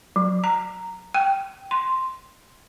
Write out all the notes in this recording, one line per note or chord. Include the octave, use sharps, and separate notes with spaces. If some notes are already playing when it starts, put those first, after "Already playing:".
F#3
A#5
G5
C6